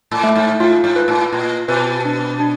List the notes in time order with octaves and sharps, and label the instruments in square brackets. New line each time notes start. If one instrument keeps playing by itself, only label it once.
[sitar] A2
[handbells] A3
[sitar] G#2
[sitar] G#2 [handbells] F4
[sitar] G#2
[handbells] B4
[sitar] A2
[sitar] A#2 [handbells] F4
[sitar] B2 [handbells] B4
[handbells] D4
D4